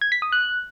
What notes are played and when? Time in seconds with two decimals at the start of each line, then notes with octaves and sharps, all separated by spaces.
0.01 G#6
0.12 B6
0.22 D#6
0.32 F#6